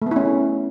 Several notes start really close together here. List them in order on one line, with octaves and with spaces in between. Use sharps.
A3 B3 E4 C#4